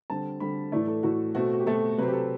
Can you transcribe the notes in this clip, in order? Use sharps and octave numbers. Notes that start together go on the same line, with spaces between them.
D3 G3 C4 A5
D3 G3 C4 B5
A2 E3 A3 D5
A4
A2 E3 A3 F#4
B2 A3 C4 F#4
F#4
G4
B2 A3 C4 A4
C3 F#3 C4 B4
G4
A4